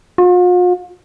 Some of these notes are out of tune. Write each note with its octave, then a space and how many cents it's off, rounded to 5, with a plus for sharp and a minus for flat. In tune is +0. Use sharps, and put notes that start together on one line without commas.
F4 +45